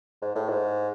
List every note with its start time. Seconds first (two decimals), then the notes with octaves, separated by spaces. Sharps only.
0.22 G#2
0.35 A2
0.49 G#2